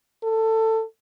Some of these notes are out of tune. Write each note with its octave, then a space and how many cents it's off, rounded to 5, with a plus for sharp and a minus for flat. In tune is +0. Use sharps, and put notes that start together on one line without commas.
A4 +20